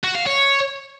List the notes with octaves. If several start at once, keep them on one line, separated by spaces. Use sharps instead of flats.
F#4
F5
C#5